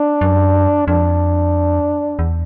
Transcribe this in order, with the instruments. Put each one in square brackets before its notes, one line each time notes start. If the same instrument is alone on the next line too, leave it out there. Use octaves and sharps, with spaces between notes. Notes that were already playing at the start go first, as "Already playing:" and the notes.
Already playing: [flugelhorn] D4
[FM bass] F#2
[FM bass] F2 [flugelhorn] D4
[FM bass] E2